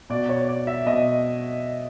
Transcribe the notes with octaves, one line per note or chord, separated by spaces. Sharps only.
B2 D5
C#5
D5
E5
B2 D#5